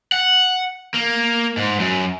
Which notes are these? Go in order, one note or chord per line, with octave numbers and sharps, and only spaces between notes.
F#5
A#3
G#2
F#2